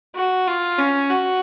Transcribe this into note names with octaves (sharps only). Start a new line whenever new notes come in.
F#4
F4
C#4
F#4